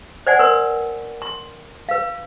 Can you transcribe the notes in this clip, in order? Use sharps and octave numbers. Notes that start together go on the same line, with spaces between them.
C5 D5 F#5 G#5
A#4 B4 C6
C6
B4 F5